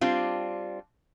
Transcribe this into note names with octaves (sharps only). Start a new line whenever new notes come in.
G3 C4 D4 F4